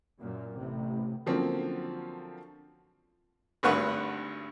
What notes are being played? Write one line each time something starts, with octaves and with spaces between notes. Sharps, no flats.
F#2 A#2
A1 C3
D3 F3 F#3 A#3 C4 C#4
G#1 D2 G2 B4 F#5 C#6